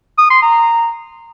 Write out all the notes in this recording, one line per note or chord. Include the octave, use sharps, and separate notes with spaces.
D#6
C6
A#5